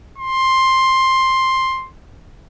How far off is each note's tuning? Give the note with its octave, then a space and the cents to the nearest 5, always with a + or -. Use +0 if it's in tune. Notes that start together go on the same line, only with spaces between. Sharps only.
C6 +10